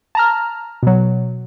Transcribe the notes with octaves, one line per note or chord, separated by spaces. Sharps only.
A5 A#5 F6
B2 F#3